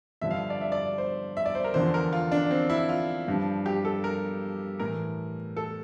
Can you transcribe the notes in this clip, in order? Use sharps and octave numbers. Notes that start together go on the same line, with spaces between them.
G2 D3 F3 E5
F5
D5
E5
D5
C5
E5
D5
C5
A#4
E2 D3 F3 C5
A#4
F4
D4
C4
E4
F4
G2 F3
G4
A4
A#4
A2 E3 A#4
A4